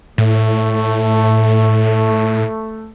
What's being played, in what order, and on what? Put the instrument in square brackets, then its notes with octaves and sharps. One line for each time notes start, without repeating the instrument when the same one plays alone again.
[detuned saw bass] A2 [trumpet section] A3